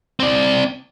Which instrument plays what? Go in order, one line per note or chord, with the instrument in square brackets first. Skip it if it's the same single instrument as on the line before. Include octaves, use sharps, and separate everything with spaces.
[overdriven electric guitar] C4 D5